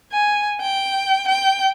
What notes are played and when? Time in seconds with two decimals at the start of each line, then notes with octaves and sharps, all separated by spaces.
0.12 G#5
0.61 G5
1.28 G5